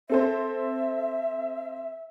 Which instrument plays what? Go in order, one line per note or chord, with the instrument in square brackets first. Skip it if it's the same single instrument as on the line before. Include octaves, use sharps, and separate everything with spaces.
[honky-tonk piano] C4 A4 C5 [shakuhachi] E5